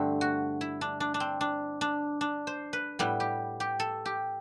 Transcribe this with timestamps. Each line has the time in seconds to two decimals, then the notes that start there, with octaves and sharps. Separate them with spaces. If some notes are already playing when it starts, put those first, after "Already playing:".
Already playing: G2 D3 A3 C4
0.21 F#4
0.61 E4
0.81 D4
1.00 D4
1.14 D4
1.20 C4
1.41 D4
1.81 D4
2.21 D4
2.47 C5
2.73 B4
2.99 A2 G3 B3
3.20 G4
3.60 G4
3.79 A4
4.06 G4